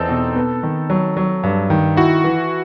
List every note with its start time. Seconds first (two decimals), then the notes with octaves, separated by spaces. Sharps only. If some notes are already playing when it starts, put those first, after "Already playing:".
Already playing: E2 C4 D#4 A4
0.09 B2
0.36 B3
0.63 D#3
0.90 F#3
1.17 F#3
1.43 G2
1.70 D#3
1.97 E4 F#4
2.24 E3